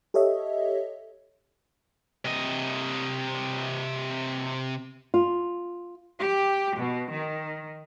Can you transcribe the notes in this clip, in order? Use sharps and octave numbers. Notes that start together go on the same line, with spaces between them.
G4 A4 C#5 D#5 E5
C3 D#5
F4
G4
B2
D#3